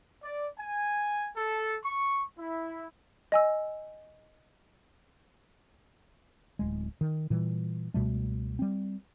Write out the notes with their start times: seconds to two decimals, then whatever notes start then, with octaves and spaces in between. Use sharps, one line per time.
0.23 D5
0.58 G#5
1.35 A4
1.84 C#6
2.38 E4
3.32 D#5 G#5 E6
6.59 D1 G#3
7.01 D#3
7.30 A#2 E3 G3
7.94 C#2 B2 G3 A3
8.59 G3 C4